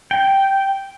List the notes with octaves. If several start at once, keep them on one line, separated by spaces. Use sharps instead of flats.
G5